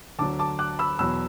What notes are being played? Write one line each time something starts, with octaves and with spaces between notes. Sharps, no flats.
D2 D3 F#3 A5 D6
A5 D6
D6 F#6
B5 E6
E2 B2 F#3 B5 E6